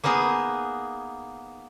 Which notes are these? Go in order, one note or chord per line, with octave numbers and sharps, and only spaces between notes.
A#3 B3 D#4 G#4